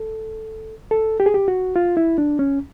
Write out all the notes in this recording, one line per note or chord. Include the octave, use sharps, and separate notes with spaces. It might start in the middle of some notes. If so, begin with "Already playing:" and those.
Already playing: A4
A4
G4
G#4
G4
F#4
F4
E4
D4
C#4